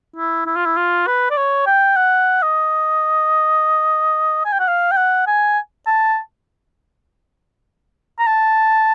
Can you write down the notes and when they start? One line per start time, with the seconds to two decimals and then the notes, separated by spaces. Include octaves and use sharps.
0.17 E4
0.47 E4
0.56 F4
0.66 E4
0.77 F4
1.07 B4
1.31 D5
1.37 C#5
1.67 G5
1.97 F#5
2.43 D#5
4.46 G#5
4.53 G5
4.60 F#5
4.68 F5
4.92 G5
4.98 F#5
5.28 G#5
5.87 A5
8.19 A#5
8.27 A5